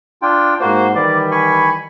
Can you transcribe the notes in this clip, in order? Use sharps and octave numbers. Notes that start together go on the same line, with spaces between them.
D4 F4 G5
G#2 A#3 F#4 C5
D#3 E3 G3 D5
G#5 B5 C#6